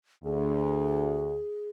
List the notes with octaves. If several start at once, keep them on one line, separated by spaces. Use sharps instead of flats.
D2 G#4